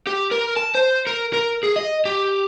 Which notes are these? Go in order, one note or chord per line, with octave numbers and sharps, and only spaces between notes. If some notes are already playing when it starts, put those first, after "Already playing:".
G4
A#4
A5
C5
A#4
A#4
G#4
D#5
G4